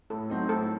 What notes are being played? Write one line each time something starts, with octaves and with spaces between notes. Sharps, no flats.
A2 A4
F#3 A3 C4 D#4
A2 A4